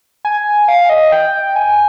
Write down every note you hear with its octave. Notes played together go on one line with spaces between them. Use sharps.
G#5
F5
D#5
G5
G#5